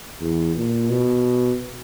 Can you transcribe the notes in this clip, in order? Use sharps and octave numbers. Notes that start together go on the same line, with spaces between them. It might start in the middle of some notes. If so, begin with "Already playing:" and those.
E2
A#2
B2